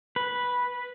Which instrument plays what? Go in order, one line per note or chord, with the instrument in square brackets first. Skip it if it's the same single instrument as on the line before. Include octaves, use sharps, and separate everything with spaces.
[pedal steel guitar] B4